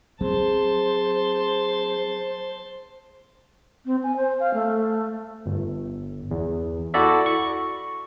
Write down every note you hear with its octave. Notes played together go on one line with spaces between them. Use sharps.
F#3 C4 G#4 C5 A5 C6
C4
G#5
C5
F5
A3
G1
E2
E4 F#4 A4 D5 E5
C#6